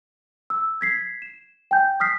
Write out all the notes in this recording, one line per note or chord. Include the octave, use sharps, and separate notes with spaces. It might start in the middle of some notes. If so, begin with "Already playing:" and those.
E6
G#6 B6 C7
E7
G5 G#5 G6
D#6 F6 B6 C7